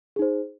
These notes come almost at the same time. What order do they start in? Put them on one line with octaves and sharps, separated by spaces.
G#4 D#4 C5